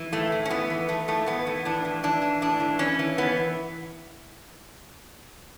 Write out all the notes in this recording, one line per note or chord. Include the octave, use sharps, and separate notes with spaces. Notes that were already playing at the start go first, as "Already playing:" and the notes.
Already playing: E3
A2 A3
E3
C#4
E3 B3
E3
E3 A3
A2 A3
A2 B3
E3
A2 D4
E3
E3 D4
E3
A2 D4
E3
E3 C#4
E3
E3 B3